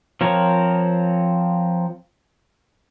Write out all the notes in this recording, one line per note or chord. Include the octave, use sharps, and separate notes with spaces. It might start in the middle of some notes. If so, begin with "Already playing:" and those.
F3 C4 A#4 C#5